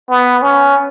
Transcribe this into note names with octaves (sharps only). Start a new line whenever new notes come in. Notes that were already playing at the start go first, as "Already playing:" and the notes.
B3
C#4